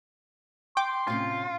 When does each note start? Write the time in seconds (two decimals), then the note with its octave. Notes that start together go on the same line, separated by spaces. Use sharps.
0.77 G5 C6 D6
1.08 A2 C3 C#4 F4